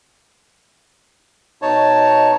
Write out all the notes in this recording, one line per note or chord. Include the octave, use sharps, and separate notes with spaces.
B2 D#4 C#5 A5